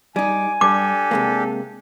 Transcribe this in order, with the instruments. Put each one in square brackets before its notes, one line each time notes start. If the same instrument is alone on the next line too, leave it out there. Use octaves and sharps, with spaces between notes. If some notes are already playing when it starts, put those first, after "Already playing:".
[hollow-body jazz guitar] G3 D#4 [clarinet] G#5 [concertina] D6
[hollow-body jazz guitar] G2 [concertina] D4 G4 A4 [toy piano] D6
[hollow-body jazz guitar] C3 G#3 A#3